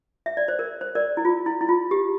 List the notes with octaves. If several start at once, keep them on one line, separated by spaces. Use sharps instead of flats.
E5
D5
C5
A#4
C5
A#4 D5
E4
F4
E4
E4
F4
G4